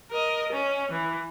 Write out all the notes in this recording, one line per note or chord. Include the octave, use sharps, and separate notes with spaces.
A#4 D#5
C#4
E3